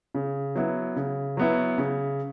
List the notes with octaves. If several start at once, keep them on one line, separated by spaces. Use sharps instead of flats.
C#3
F#3 B3 E4
C#3
F#3 B3 E4
C#3